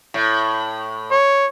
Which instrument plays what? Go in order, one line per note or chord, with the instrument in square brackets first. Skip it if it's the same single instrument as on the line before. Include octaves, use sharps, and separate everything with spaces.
[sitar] A2
[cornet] C#5